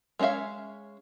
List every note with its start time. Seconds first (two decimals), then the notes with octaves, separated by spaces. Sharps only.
0.19 G#3 C#4 C#5 E5 F5